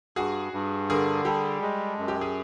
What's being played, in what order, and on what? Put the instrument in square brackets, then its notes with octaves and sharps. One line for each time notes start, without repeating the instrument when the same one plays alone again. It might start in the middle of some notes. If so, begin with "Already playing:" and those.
[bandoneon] G2 [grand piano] F#4 G#4
[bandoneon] G2
[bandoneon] D3 [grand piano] G#4 A#4
[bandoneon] G3 [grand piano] G4 A4
[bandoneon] G#3
F#2
[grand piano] G4
G#4